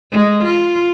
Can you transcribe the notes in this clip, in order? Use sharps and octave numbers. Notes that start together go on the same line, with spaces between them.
G#3
F4